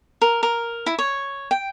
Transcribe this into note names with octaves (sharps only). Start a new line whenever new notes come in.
A#4
A#4
E4
C#5
G5